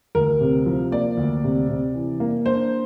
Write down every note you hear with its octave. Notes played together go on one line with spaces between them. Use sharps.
D2 A#4
C3
F3
A#3 D5
D2
C3
C3
E3
A#3
D4 C5